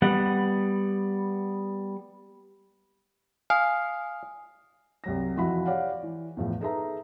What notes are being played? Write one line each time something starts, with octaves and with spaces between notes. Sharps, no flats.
G3 B3 F#5
F5 G#5 D#6
C2 F#3 A#6
F2 E3 F3 F#4 E5 B5
G4 C#5 D5 F5 F#5
E3
E2 A2 F3
D#4 G#4 A4 B4 E5 A#5